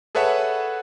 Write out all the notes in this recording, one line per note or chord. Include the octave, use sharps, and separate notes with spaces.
G#4 A4 B4 C#5 E5 F#5